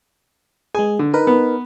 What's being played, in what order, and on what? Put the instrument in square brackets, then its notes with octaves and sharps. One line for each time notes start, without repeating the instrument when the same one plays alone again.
[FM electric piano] G#3 G#4 [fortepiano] G#5
[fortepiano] D3
[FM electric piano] D#4 A#4 B4 [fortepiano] D#5
[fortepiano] B3